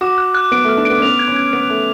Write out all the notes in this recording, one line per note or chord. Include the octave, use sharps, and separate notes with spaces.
F#4 D6
F#6
F#6
B3 D7
A3 F6
D4
B3 D7
C#4
B3 F7
G#6
C#4
G#6
B3 D7
A3 G#6